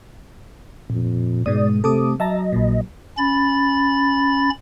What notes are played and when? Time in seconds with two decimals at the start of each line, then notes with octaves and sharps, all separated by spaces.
0.90 F2 A#2
1.46 G#2 B2 G#3 D5 D#6
1.84 C3 A3 A4 D6 D#6
2.20 F#3 D#5 E5 A5 A#5
2.53 A#1 A#2
3.18 C#4 B5 A6